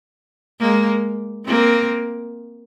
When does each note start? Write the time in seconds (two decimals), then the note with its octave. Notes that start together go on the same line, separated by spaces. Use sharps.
0.60 G#3 A#3
1.46 A#3 C4